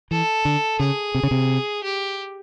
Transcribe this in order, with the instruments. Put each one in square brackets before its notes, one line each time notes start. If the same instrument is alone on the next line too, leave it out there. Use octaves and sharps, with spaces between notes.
[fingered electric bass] E3 [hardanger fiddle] A4
[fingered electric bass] D3
[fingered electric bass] C#3 [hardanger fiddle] G#4
[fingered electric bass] C3
C#3
C3
[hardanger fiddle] G4